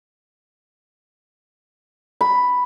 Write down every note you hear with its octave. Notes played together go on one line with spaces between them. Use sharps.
B5